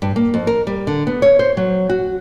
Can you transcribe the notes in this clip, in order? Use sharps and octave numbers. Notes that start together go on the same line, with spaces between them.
G2
A#3
F2
A#4
G3
D3
B3
C#5
C5
F#3
F#4